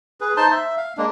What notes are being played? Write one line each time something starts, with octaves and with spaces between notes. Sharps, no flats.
G#4 B4
D#4 C5 A5 C6
E5
F5
G#3 A#3 D4